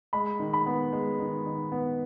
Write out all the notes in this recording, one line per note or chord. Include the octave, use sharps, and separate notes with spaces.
G#3 B5
D#3
B5
B3
G#3
D#3
D#3
B3